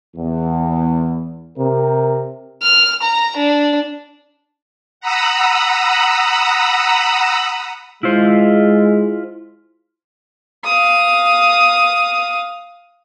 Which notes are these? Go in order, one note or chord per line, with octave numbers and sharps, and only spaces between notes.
E2
C3 A#4
F6
A#5
D4
F#5 A#5 B5 D#6 E6
G#3 E4 F4 C5
F5 D#6